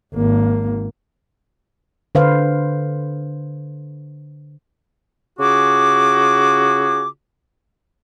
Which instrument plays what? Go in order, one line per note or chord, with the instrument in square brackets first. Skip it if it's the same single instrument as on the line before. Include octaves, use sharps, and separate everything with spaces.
[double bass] G#1 A#3
[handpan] D3 B4 C5 F5
[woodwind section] C#3 F4 F#4 G#4 D6